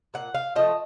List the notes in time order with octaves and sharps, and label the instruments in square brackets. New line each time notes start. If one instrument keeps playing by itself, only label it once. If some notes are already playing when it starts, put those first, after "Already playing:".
[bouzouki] A#2 F#5
F5
F3 A3 D#5